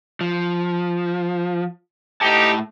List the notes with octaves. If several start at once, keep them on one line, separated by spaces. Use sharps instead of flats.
F3
D2 A2 D#4 G4 A5